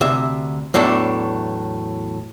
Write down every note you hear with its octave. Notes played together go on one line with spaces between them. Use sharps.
D2 C3 E5
E2 A2 F#3 D4 A4